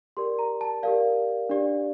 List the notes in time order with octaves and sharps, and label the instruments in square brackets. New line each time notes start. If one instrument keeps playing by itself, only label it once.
[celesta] G4 A#4 D5 C6
A#5
A5
G4 A#4 D5 F5
D4 G4 D5